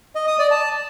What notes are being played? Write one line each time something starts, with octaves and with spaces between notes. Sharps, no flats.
D#5
D#6
D5
A5